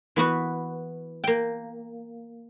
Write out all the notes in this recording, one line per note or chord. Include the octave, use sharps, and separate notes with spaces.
E3 B3 F#4 B4
A#3 G5